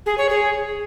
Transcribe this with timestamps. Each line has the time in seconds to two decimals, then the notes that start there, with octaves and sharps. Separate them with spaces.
0.06 G#4
0.18 C#5
0.29 G#4